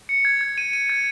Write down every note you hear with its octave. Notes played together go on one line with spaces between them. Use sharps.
C#7
G#6
G#6
D#7
D#7
G#6